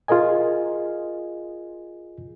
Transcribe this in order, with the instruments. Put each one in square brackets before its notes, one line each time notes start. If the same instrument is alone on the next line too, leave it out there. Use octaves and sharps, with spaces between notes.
[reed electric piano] F4 G#4 A#4 D#5 G#5